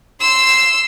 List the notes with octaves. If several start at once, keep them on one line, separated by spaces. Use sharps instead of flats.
C6 E6